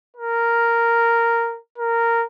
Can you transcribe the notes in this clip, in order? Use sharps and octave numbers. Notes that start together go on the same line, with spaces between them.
A#4
A#4